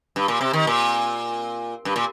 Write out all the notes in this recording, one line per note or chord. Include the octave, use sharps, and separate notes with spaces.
G2
A#2
C3
D#3
A#2
G2
A#2